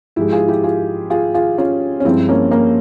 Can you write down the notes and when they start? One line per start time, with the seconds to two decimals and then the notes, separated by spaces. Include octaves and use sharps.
0.16 G#2 F3 G#3 E4 G4
0.32 F4 G#4
0.48 E4 G4
0.64 F4 G#4
1.10 F4 G#4
1.34 F4 G#4
1.58 C#4 F4
2.00 C#4
2.04 G2 F3 G#3 C4 E4
2.29 A#3 C#4
2.51 A#3 C#4